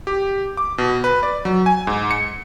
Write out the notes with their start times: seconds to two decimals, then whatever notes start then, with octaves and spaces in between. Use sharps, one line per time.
0.07 G4
0.57 D6
0.78 B2
1.04 B4
1.23 D5
1.45 F#3
1.66 G#5
1.87 G#2
2.11 C#7